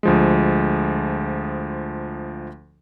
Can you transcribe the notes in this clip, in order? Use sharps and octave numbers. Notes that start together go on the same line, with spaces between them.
D2 F3 G#3